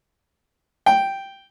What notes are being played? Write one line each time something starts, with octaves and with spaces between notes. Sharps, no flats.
G5